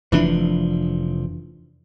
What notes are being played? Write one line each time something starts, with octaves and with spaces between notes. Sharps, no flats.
F1 E3 F3 D4